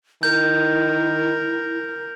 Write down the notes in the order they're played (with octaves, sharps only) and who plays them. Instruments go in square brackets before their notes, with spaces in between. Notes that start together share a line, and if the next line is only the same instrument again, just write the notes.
[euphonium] D#3 [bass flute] E4 [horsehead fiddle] A#4 [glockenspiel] G6